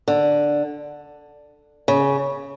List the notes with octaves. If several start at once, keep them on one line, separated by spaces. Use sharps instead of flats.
D3
C#3